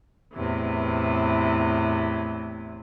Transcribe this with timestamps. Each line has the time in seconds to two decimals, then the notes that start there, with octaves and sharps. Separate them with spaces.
0.34 E2 A2 C3 E3